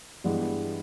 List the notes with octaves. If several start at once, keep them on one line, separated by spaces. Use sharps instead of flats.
G2 E3 G#3 B3